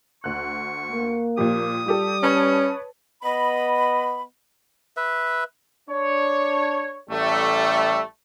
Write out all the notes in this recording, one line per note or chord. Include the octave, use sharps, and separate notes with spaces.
D2 C#6 F#6
A#3
A#2 F3 G4 D#6
G3 F4 G4 A4
C#4 B4 C#5 A5
B3 D#5 B5
B4 E5
D4 C#5
A1 G3 A3